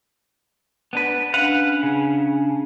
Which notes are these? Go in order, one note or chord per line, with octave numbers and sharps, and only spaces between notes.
B3 D4 B4
C#4 D4 B4 F5 F#5
C#3